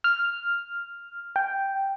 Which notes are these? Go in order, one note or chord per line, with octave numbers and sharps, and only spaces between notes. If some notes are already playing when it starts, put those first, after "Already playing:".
F6
G5